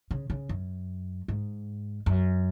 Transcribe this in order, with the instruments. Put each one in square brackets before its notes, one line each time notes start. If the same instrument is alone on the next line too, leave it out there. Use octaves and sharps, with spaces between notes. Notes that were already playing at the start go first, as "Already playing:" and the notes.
[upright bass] C#3
C#3
F#2
G#2
F#2